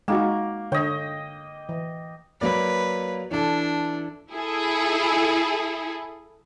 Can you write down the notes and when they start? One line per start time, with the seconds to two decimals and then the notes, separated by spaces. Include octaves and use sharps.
0.08 G#3 A#3 D#4 F#4
0.72 D3 C#5 D#5 G5
1.69 E3
2.41 F#3 A#3 B4 D5
3.31 E3 D4 A4
4.32 E4 G#4 A4